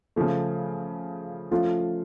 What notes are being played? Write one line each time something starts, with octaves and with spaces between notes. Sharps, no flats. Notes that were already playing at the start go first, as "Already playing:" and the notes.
C#3 F3 A3
F3 A3 C#4 F4